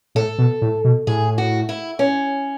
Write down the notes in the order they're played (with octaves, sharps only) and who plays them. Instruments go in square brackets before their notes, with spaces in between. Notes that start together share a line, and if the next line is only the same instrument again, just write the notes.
[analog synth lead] A2 [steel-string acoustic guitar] A4
[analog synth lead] B2
A2
B2
[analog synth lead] A2 [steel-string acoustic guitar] G#4
[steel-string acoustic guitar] F#4
E4
C#4